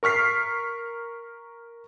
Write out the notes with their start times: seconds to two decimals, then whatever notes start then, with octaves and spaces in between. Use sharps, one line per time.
0.03 A#4 C#6 F6 B6 C7